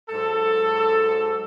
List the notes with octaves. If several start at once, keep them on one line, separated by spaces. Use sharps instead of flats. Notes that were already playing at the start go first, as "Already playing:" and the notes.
G#2 F#3 A4